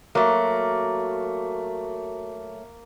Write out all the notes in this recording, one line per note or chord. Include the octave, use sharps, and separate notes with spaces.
F#3 A3 A#3